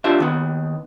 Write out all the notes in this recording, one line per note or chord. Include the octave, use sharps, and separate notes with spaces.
D4 F4 G4 C5 E5
D#2 D#3 B3